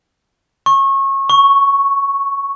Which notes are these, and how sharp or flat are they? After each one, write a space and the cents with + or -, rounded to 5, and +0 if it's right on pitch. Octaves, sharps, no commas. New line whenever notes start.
C#6 -25
C#6 +0